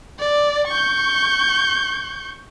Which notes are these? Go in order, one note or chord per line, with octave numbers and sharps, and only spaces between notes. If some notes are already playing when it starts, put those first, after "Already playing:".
D5
C#6 G6